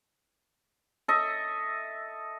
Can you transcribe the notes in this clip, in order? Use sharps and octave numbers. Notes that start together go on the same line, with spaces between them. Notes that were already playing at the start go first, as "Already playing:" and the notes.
A4 D#5 E5